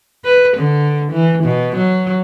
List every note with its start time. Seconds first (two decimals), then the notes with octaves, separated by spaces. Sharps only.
0.25 B4
0.58 D3
1.12 E3
1.44 B2
1.77 F#3